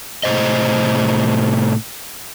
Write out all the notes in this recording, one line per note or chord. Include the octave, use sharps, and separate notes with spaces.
A2 C3 C5 D#5